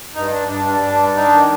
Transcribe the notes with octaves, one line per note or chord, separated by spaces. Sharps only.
G2 D#4
D4
G2 D4
G3 D4
G2 D4
G3
D4 D#4
D#3